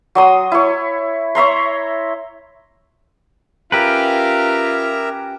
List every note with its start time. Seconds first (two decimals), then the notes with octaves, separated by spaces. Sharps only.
0.15 F#3 C6 D#6
0.52 E4 C#5
1.35 C#5 E5 A#5 C6
3.72 C#4 F4 G4 A#4 B4 E5 A#5